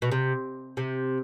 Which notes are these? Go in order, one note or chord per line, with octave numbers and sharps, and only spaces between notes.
B2
C3
C3